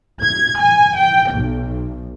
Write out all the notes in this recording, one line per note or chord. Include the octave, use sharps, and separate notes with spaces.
G#6
G#5
G5
B1